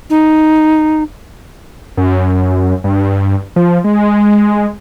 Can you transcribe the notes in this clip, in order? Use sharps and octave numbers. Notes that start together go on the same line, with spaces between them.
D#4
F#2
G2
F3
G#3